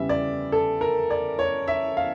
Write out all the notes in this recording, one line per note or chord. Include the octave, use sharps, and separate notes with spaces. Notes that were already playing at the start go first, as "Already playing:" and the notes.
Already playing: E2 C#3 G3 E5
D5
A4
A#4
D5
C#5
E5
F5